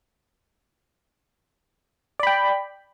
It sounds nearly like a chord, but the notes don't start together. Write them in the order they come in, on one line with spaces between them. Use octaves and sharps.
D5 B5 G5